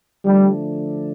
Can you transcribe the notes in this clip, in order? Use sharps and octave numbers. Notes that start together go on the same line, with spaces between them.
D3 F3 G3 A3 D4